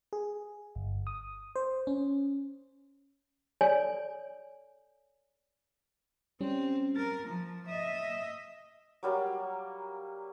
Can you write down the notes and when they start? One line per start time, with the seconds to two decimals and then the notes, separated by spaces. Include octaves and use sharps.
0.13 G#4
0.75 G1
1.07 D#6
1.56 C5
1.87 C#4
3.61 A4 C#5 D5 G#5
6.41 G3 C4 C#4
6.96 A#4 A6
7.27 F3
7.66 D#5 E5
9.03 F#3 G3 A#3